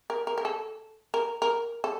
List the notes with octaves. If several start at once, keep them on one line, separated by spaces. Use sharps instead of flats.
A#4
A#4
A#4
A4
A#4
A#4
A4